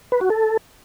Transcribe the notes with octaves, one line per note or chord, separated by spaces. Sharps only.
B4
F#4
A4